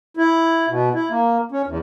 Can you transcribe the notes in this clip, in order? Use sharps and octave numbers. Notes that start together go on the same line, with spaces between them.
E4
B2
E4
A#3
C#4
E2